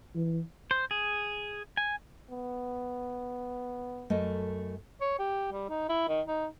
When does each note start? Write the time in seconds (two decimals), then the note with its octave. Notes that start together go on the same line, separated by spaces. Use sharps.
0.15 E3
0.71 C5
0.91 G#4
1.77 G#5
2.30 B3
4.10 F#2 A3 D#5
5.01 C#5
5.19 G4
5.52 G3
5.69 D#4
5.89 E4
6.08 D#3
6.28 D#4